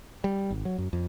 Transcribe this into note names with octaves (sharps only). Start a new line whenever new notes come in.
G3
G#1
F#3
F#2
F2